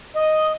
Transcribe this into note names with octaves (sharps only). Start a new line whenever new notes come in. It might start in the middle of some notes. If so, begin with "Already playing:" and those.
D#5